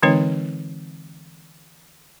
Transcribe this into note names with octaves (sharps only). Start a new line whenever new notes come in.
D3 E3 G#3 C4 D#4 C#5